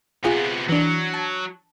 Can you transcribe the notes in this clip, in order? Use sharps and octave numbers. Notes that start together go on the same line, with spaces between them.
C3 B3 F4 G#4 F#5
E3 F#3 D4
A5